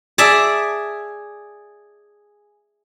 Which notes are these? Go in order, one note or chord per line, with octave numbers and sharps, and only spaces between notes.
G#4 D5 E5 A5